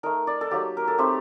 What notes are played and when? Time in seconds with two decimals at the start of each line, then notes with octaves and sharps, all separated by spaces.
0.03 A3 D#4 A#4
0.27 D5
0.41 A4
0.51 F#3 A#3 D#4 G4
0.77 A#4
0.88 A4
0.98 A3 C4 D#4 G4